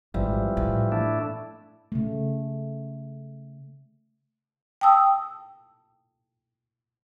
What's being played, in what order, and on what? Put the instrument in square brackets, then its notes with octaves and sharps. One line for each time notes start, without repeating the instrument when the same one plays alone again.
[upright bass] G#1 [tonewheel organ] E3 F3 G3
[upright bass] A2
[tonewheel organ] A3 D4 E4
[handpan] C#3 A3
[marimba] G5 A5 D#6 E6